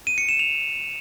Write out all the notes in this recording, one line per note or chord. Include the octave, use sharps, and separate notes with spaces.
D#7
C#7
E7
F7